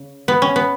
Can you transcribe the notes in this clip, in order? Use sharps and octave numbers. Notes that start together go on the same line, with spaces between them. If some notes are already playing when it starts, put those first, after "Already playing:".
Already playing: C#3
B3
C#4
B3